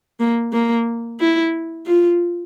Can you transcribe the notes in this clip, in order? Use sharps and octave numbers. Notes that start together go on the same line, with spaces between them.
A#3
A#3
E4
F4